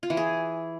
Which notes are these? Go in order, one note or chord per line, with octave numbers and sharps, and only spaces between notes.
F4
E3
G#4